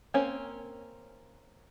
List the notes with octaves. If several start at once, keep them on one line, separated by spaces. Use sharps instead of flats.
A#3 C4 C#4 C#5